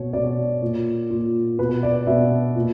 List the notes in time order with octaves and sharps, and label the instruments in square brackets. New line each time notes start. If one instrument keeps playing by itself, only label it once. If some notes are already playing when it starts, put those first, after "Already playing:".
Already playing: [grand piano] B2 C#5
B2 D5
A#2
A#2
B2 B4
D5
B2 E5
A#2